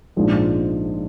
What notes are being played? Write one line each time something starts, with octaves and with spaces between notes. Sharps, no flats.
A#1 G#2 F3 G#3